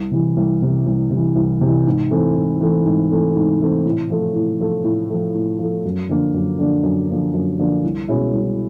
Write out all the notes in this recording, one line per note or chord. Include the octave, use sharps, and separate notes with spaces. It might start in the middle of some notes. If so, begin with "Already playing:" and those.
Already playing: C2
C3 E3
C2
C3 E3
C2
C3 E3
C2
C3 E3
G#2
E3 A3 C4
G#2
E3 A3 C4
G#2
E3 A3 C4
G#2
E3 A3 C4
A2
F3 A3
A2
F3 A3
A2
F3 A3
A2
F3 A3
F#2
D3 F3 A#3 D4
F#2
D3 F3 A#3 D4
F#2
D3 F3 A#3 D4
F#2
D3 F3 A#3 D4
C2
B2 G#3 C#4 E4
C2